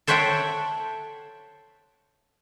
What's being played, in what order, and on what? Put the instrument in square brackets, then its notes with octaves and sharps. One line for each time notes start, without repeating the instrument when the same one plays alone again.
[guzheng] A4 C5 C#5 E5 F#5 G5